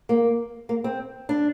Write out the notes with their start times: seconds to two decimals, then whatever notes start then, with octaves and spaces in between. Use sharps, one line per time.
0.09 A#3
0.69 A#3
0.84 C4
1.29 D4